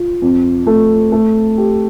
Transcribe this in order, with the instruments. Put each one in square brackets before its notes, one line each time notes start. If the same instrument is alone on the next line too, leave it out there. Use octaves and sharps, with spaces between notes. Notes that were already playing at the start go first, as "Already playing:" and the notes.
Already playing: [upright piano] F4
F2
A3
A3
G4